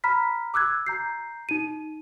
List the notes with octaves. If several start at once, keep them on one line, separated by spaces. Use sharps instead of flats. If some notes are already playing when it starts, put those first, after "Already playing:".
A#5 B5 F6 B6
D6 E6 F#6 G#6
A#5 G6 C7
D#4 D#7